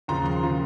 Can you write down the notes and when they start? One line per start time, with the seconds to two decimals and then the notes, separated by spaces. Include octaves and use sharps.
0.08 D#2 C#3 F3 A#5 C6
0.26 A#5 C6
0.44 C#3 F3